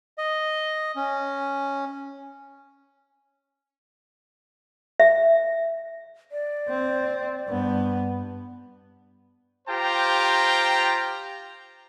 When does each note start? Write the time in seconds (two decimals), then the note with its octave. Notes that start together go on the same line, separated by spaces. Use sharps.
0.18 D#5
0.96 C#4
5.00 E5
6.32 D5
6.69 C4
7.48 G2 B3
9.68 F4 G4 C5 G5 A#5